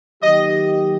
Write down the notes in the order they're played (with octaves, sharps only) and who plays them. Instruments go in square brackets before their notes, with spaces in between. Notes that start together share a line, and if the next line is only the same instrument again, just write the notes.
[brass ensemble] D#3 F#3 A#3 D#4 G4 [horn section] D#5